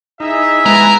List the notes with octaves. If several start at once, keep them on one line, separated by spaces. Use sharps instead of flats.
D#4 E4 G#4 E5
G#3 B3 A#4 G#5 A#5